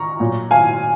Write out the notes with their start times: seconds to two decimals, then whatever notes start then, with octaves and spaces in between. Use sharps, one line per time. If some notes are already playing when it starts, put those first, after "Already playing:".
Already playing: A#5 C#6
0.20 A#2 F#3
0.51 F5 G#5